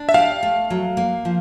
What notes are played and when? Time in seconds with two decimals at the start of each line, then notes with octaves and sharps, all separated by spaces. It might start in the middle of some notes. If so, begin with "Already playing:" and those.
Already playing: D4
0.09 E5
0.14 G4 F5
0.43 A3
0.70 F#3
0.97 A#3
1.25 F3